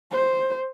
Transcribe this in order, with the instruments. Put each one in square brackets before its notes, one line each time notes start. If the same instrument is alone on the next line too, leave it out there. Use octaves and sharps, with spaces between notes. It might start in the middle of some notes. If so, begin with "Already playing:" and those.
[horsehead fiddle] C5